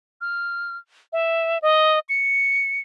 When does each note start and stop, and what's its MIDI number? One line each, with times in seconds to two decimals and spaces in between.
0.21 0.77 89
1.13 1.58 76
1.62 1.99 75
2.09 2.80 97